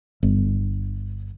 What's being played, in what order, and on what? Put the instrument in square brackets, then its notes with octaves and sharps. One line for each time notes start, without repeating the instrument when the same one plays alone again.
[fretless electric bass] G1